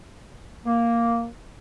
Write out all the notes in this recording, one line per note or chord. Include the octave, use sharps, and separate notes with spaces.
A#3